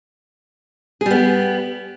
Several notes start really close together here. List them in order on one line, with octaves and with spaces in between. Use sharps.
G#4 G3 B3 G4